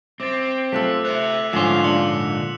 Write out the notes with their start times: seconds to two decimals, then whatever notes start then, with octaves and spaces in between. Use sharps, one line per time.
0.20 C4 E5 D6 A6
0.72 A3 F4 A4 E6 F#6 B6
1.05 C5 E5 F#6 F7
1.53 G#2 D3 F3 C#4 F4 F5 E7
1.84 A#2 D4 D6 C#7 F#7